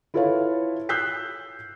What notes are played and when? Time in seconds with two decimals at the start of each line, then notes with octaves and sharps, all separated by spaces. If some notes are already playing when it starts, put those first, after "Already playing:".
0.14 E4 F4 A4 B4 C#5 F5
0.89 E6 F#6 G6 B6 C7